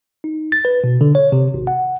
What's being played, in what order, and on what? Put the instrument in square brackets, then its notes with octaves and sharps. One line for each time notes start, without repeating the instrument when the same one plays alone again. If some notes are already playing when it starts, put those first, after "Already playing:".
[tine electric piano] D#4
A6
B4
B2
D3
C#5
C3
G#1
F#5